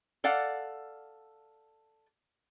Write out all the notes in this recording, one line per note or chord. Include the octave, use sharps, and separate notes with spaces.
A4 D5 F5 F#5